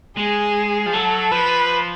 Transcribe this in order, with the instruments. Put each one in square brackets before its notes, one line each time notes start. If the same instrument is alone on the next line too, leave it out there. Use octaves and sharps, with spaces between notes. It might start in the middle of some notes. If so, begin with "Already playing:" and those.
[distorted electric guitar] G#3 [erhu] G#4
[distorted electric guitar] F3
[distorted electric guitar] F#3 [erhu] A4
[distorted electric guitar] F3 [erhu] B4